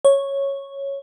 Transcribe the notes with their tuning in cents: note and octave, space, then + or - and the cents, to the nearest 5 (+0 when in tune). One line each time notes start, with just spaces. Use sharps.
C#5 -5